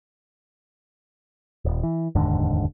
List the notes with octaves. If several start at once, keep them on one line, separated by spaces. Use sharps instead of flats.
D#1
E3
F1 D#2 G#2 D3